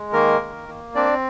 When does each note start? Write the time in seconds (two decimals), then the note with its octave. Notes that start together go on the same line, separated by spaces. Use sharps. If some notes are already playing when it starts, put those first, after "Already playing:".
Already playing: G#3
0.13 D#3 A#3 A#4
0.41 D#3
0.69 A#3
0.95 C4 D4 D5